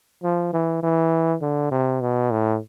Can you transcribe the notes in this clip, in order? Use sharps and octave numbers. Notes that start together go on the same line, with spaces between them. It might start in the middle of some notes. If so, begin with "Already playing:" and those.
F3
E3
E3
D3
C3
B2
A2